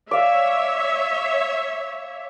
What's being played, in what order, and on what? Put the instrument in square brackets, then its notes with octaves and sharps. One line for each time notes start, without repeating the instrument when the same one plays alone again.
[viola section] C#5 E5 [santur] D5 F5